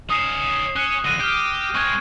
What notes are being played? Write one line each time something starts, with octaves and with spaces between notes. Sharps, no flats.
C#4 D#4 D#6 C7 E7
C#4 F#6
F2 D3 A#6 D#7
G4 F6 G6
G#3 C4 C#6 F#6 G#6